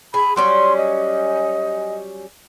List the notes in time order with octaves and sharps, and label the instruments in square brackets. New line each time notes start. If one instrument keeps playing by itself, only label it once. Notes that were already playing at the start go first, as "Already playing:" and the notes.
[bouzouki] G#4 [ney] B5
[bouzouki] F#3 G3 C#4 [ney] C6
[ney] D#5